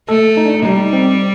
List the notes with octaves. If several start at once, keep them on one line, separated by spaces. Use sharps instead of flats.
A3 A4
D#4
D4
D#4
G3 D#4
C4